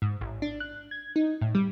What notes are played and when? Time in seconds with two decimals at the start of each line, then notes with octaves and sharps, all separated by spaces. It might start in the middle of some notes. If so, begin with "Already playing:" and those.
0.02 G#2
0.21 A1
0.42 D4
0.60 F#6
0.91 G#6
1.16 D#4
1.41 A2
1.55 G3